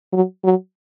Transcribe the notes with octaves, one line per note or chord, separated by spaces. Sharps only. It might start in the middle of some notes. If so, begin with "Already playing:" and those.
F#3
F#3